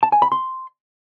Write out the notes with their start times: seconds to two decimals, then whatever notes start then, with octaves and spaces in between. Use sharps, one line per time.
0.03 A5
0.12 G#5
0.22 B5
0.32 C6